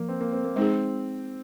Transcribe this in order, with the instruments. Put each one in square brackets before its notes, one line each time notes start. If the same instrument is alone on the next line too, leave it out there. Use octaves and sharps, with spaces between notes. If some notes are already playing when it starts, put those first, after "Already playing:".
Already playing: [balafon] F3 [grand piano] A#3
[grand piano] C4
A#3
C4
A#3
[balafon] G#3 D#4 G#4 [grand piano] C4